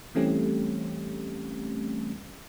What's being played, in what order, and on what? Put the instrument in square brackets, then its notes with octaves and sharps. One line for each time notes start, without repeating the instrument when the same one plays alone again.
[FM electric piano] E3 G3 A3 C4 C#4 G4